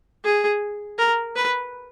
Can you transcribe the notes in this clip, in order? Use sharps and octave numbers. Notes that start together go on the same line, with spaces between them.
G#4
A#4
B4